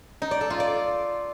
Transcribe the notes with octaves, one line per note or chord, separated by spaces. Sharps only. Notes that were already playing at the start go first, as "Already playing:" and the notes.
D#4
D5
A4
F4
D5